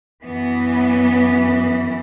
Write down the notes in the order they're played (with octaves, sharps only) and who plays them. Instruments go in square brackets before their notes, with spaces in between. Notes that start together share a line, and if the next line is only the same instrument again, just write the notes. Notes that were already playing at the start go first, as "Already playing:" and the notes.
[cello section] F#2 E3 B3